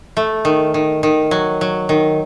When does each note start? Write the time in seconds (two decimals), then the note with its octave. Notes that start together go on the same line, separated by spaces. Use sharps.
0.17 A3
0.45 D#3
0.74 D#3
1.03 D#3
1.31 F#3
1.61 F#3
1.89 D#3